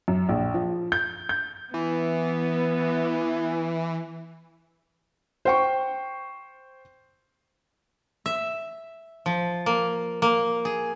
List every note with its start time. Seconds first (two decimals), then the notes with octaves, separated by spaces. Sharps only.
0.08 F#2
0.29 A#1
0.54 F3
0.92 G6
1.29 G6
1.74 E3 B3
5.45 C5 G5 C#6
8.26 E5
9.26 F3
9.66 A#3
10.22 A#3
10.65 G#4